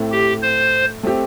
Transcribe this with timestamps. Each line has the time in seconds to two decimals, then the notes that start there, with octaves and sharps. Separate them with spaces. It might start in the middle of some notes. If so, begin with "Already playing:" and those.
Already playing: A2 A3 C4
0.12 G4
0.42 C5
1.03 A3 C4 G4